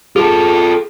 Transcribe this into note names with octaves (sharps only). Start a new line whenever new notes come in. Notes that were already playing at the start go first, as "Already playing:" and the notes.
F4 G#4 A4